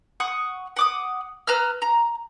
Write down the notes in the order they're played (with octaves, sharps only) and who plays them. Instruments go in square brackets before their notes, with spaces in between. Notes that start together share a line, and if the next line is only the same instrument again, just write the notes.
[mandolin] F#5 C#6 D#6
F#5 D6 D#6
B4 A#5 E6 F6
A#5